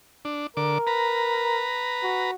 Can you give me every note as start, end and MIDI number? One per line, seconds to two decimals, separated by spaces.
0.25 0.47 62
0.57 0.78 50
0.57 1.63 70
0.57 0.78 86
0.87 2.31 71
0.87 2.31 82
2.03 2.35 66